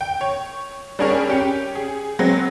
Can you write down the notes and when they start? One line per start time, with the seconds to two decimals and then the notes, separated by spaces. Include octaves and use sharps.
0.01 G5
0.21 C#5
0.99 G3 C#4 D4 G#4 A#4 C#5
1.28 C#4 G4 C#7
1.75 G#4
2.19 F#3 G#3 B3 C4